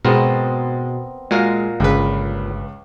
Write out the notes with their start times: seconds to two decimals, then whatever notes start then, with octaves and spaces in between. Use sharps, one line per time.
0.05 G#2 B2 B3 C4 A#4
1.31 A#2 G#3 F#4 A#4 F5
1.80 G1 C#2 C#3 B4